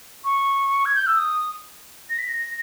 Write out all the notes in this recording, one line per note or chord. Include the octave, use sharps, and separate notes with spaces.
C#6
G#6
G6
E6
D#6
A#6
B6
A#6